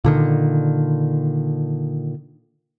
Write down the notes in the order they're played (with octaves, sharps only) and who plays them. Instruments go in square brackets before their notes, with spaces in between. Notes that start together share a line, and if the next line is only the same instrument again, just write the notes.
[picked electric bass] A#2 D3 D#3